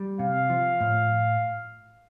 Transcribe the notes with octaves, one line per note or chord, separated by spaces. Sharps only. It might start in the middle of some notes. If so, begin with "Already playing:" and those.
Already playing: G3
C3 F5
F3
A2